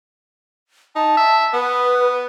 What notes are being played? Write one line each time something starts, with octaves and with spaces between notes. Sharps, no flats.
D#4 A5
E5
B3 B4